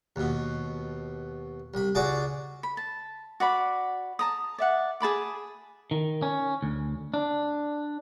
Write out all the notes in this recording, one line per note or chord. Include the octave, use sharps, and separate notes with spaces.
D#2 B2
C2 B5
C#2 F#4 G#4 D5 D6
B5
A5
F#4 D5 B5
A5 A#5 D#6
D5 E5 F#5
G#4 A5 B5 D6
D#3
C#4
D2
D4